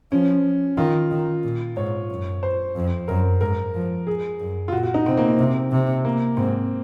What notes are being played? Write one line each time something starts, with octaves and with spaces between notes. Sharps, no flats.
F3 C#4
D#3 F4
D#3
A#2
G#2 C#5
F#2
C5
F2
F#2 A#4
G#2 A#4
F3
G#4
F#2
F4
A#2 F#4
F#4
D#4
C3 C4
A#3
C4
C3
C3
A#3
G#2 C4